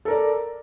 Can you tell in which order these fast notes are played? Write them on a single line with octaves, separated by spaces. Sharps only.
A4 A#4 D5